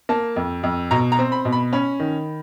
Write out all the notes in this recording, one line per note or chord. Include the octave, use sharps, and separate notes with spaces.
A#3 A5
F2
F2
B2 A#5
A#5
C4
B5
B2
B5
C#4 B5
D#3